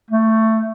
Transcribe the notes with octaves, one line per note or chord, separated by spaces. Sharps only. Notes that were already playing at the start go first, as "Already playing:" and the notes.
A3